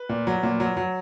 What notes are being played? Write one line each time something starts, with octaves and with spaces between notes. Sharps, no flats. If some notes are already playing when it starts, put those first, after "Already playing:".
Already playing: B4
A#2
F#3
A#2
F#3
F#3